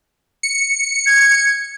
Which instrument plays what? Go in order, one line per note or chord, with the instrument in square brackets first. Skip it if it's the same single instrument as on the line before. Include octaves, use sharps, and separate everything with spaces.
[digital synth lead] C#7
[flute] G#6